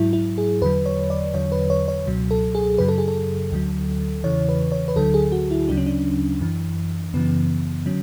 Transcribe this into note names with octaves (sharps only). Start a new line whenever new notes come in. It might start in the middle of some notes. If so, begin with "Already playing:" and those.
Already playing: G#2 F#3 E4
E4
G#4
E2 D3 F#3 B4
C#5
D5
E2 D3 F#3 C#5
B4
C#5
C#5
C#2 B2 F#3
A4
G#4
F#2 C#3 F#3 B4
A4
G#4
A4
D2 D3 F#3
E2 C#3 E3 C#5
B4
C#5
B4
D2 D3 F#3 A4
G#4
F#4
E4
D2 C#3 F#3 D4
C#4
D4
F#2 E3
F#2 C#3 E3 B3
D3 F#3 C#4